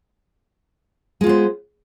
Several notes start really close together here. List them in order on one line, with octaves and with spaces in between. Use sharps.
G#3 F4 B3 C5